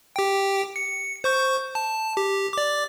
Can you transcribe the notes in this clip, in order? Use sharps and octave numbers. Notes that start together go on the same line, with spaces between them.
G4 G5
C#7
C5 C#6 G6
A5
G4
D5 D6